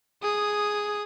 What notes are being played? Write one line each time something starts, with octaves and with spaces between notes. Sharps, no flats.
G#4 D#6